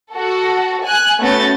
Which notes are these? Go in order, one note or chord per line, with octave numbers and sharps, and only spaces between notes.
F#4 A4
G#5 F#6
A3 B3 C#4 F#4 G6 A6